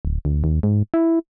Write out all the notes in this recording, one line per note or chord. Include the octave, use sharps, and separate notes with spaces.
D1
D2
D#2
G#2
E4